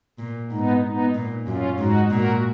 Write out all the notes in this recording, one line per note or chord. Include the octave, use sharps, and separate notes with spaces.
A#2
G#2 B3 D#4
B3 D#4
A#2
F#2 C#4 F4
G#2 D#4 F#4
A#2 F#4 A#4